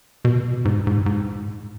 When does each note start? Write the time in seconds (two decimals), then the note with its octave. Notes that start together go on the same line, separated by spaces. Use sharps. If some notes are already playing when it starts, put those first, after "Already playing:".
0.25 B2
0.65 G#2
0.87 G#2
1.06 G#2